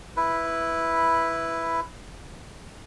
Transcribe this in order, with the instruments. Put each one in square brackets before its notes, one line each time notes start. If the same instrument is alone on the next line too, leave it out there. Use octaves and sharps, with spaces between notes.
[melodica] E4 B4